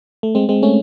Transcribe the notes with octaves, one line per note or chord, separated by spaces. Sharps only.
A3
G#3 C4
G#3 C4
A3 C#4